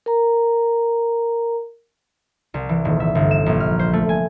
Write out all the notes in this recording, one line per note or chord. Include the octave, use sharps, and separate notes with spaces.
A#4 A#5
C2
E3
D#1
E5
G1
E7
A#1
F6
C5
A3
G#5